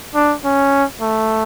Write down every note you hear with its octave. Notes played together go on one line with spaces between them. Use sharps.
D4
C#4
A3